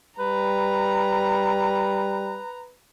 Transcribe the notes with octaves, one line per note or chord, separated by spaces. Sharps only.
G3 B4 A#5